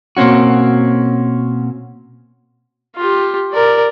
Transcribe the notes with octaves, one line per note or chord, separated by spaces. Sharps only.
B2 A#3 C4 C#4 F#4
F4 G4
A#4 D5